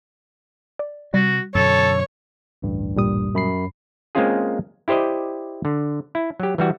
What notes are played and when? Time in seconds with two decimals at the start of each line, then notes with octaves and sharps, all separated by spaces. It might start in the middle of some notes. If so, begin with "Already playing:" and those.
0.79 D5
1.14 C3 G3 F#4
1.55 F#2 B2 D3 A4 C#5
2.62 A1 D2 G2
2.96 A#2 G3 D#6
3.35 F#2 B5 C7
4.15 G#3 A#3 C4 C#4 F4 G#4
4.88 E4 G4 C5 D5 D#5
5.65 D3
6.15 E4
6.40 F#3 G4
6.58 E3 G3 F#4